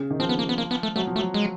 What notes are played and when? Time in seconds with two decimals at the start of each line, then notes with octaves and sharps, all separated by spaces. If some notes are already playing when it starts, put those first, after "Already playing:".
Already playing: C#3
0.11 D#3
0.20 F3 C4
0.29 B3
0.39 A#3
0.49 B3
0.58 A#3
0.71 B3
0.83 A3
0.96 F#3 A3
1.07 F3
1.16 A3
1.18 F#3
1.34 G#3